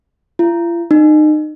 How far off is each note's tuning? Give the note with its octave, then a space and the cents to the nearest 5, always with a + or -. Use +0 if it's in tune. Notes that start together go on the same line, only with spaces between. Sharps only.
F4 -45
D#4 -30